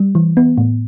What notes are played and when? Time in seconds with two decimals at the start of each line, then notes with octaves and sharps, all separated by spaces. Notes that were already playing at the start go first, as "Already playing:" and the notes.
Already playing: G3
0.15 E3
0.37 B3
0.58 A2